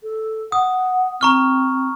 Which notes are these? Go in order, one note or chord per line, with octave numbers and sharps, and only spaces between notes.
A4
F#5 D#6
C4 A#5 C#6 F6